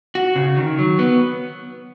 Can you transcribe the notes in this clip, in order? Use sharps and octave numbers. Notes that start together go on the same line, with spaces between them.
F#4
C#3
D#3
F#3
B3